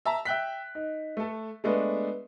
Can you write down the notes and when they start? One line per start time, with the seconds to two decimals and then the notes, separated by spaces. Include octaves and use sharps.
0.05 E5 A5 A#5
0.25 E5 G5 F#6 B6
0.75 D#4
1.17 A3 A4
1.64 G#3 A3 B3 D4